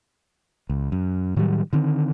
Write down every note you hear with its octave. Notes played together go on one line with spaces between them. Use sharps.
C#2
F#2
A2 D#3 F#3 G3
D3 D#3 C4